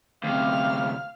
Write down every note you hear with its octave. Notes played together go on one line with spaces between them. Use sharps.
D2 C3 F5 F6